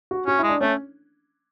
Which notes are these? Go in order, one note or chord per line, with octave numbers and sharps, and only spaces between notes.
F#4
C#4 F#4
E4
G#3
D4
A3 C#4